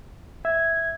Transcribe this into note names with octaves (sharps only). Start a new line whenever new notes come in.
E5 G#6